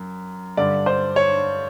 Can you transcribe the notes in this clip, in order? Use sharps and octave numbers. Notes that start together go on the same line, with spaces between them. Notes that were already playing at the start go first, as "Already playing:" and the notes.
Already playing: F#2
G2 D3 D5
C5
C#5